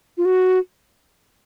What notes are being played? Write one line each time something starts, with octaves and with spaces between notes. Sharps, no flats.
F4
F#4